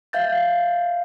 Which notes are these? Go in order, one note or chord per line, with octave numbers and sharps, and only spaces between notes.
E5 F5 G6 A6